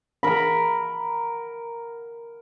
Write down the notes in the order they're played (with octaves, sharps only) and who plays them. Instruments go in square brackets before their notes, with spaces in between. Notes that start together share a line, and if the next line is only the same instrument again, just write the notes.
[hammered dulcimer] A#4 A#5 B5